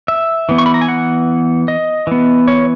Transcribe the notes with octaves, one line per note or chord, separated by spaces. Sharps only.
E5
E3 B3
C#6
B5
A#5
G#5
F#5
D#5
E3 B3
C#5